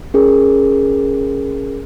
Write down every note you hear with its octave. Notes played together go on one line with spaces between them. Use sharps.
C#4 G#4 A#4